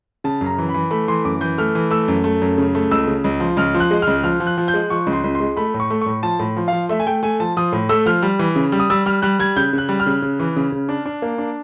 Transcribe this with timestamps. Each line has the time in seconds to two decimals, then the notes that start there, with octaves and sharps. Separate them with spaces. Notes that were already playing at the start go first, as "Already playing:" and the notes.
0.24 C#3 A5
0.41 F#2
0.46 A#5
0.58 E3
0.69 B5
0.74 E3
0.91 A3 B5
1.08 E3 C6
1.25 F#2 D6
1.41 E3 G6
1.58 A3 F6
1.75 E3
1.91 A3 E6
2.08 F#2
2.24 A3
2.42 F#2
2.58 C#3
2.75 A3
2.91 C#2 E6
3.08 C#3
3.24 C#2
3.40 F3
3.57 C#2 F6
3.74 F3
3.80 F#6
3.91 G#3
4.02 C#2 F6
4.24 F3 F6
4.40 F3
4.47 F#6
4.58 F3
4.68 G6
4.74 G#3
4.90 F3 C#6
5.06 C#2
5.13 C6
5.24 C#2
5.35 C6
5.40 G#3
5.57 A3 B5
5.74 A2
5.80 C#6
5.90 A3
6.01 A2 C#6
6.23 F3 A5
6.39 A2
6.57 F3
6.68 F3 F5
6.89 A3 E5
7.00 G#5
7.07 A3 G5
7.23 A3 G#5
7.40 F3 A5
7.57 F3 D#6
7.72 A2
7.89 A3 E6
8.06 F3 F6
8.23 G3
8.39 E3
8.56 C#3
8.72 G3
8.80 D#6
8.90 G3 E6
9.06 G3 F6
9.22 G3 F#6
9.39 G3 G#6
9.57 C#3 G6
9.73 C#3 F#6
9.89 G3
10.00 F6
10.06 C#3
10.22 C#3
10.39 E3
10.56 C#3
10.72 C#3
10.89 D4
11.06 D4
11.22 A#3
11.38 D4